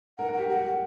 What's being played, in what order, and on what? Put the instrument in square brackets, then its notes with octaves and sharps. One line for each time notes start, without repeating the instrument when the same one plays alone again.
[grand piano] A#4 [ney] F#5
[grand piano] A#4
[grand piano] G4 [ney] F#5
[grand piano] A#4 [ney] F#5
[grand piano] G4